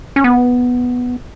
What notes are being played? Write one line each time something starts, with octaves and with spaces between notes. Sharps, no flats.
C#4
B3